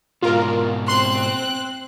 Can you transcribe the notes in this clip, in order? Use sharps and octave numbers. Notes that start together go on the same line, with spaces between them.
G#2 B2 F4 A#4
C4 C6 F#6